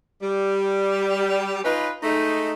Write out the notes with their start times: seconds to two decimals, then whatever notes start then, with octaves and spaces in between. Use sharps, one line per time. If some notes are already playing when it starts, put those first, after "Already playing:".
0.22 G3
1.63 C#4 D#4 F4 B4
2.03 G#3 A3 D#4